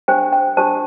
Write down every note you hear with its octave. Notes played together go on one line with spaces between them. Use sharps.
D4 G4 C5 G5
G5
D4 G4 C5 A5